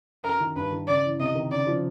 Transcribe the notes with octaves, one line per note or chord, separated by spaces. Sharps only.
F#2 A#4
D#3
G2 B4
D#3
C#3 D5
E3
C3 D#5
D#3
C#3 D5
F3